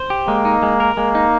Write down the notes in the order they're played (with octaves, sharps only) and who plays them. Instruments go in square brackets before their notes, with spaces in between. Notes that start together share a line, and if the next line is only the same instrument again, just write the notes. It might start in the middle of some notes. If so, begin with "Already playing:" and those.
Already playing: [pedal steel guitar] C5
G4
[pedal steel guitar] G#3 [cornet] A#3
[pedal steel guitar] D#4
G#3
A#4
[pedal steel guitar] G#3 [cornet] A#3
[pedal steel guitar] D#4